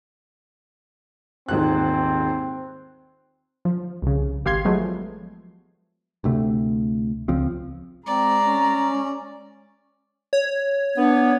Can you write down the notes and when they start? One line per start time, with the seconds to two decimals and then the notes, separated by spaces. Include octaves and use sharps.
1.48 D#1 G#2 C4 F#6
3.65 F3
4.02 C2 C#3
4.45 G#1 G4 F5 C6 G#6 C7
4.65 F3 F#3 G#3 A3 B3
6.24 D2 C3 A3
7.28 C#2 F3 C4
8.06 G#3 C4 D5 A#5
8.45 C#4
10.33 C#5
10.97 B3 D4